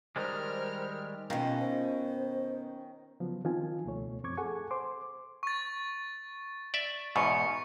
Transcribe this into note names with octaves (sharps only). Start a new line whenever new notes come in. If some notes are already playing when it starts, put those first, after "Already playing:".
D#3 G3 G#3 A#4 C5 F6
B2 D#3 C#4 F4
C5
C#3 F3 F#3 B3
D#3 F3 C4 F4 G#5
C#2 B2 A3 C#5
F#2 F3 C4 C#6 D6 G#6
G#4 A4 F#5 G#5 C#6
C5 C6 D6
C#6 A6
D5 E5
E2 G#2 B2 C#6 C#7